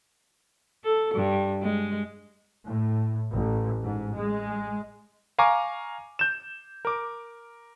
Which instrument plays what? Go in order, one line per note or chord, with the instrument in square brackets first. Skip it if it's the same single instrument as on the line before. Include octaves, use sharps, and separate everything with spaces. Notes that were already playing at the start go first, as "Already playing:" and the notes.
[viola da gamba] A4
G2
G#3
[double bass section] A2
A1
G#2
G#3
[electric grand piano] F5 G#5 A#5 C#6 D6
G6 E7
A#4 D6